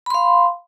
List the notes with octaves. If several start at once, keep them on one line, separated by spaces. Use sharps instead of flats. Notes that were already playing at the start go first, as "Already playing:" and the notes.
F5 B5 C6